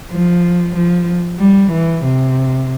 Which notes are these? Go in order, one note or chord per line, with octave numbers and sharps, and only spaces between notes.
F3
F3
G3
E3
C3